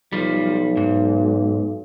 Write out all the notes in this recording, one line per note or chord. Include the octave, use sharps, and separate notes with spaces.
B1 F3 G3
G#2